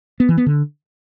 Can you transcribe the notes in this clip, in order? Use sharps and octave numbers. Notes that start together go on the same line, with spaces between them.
B3
E3
B3
D3